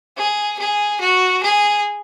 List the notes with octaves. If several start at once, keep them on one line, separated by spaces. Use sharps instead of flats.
G#4
G#4
F#4
G#4